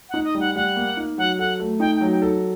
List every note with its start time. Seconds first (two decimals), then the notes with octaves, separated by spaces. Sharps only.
0.09 D#4 F#5
0.24 D#5
0.35 G3
0.40 F#5
0.56 G3 F#5
0.76 A#3
0.97 D#4
1.18 F#3 F#5
1.39 A4 F#5
1.60 A3
1.80 D#4 G5
1.96 F#3 G5
2.12 G5
2.22 A4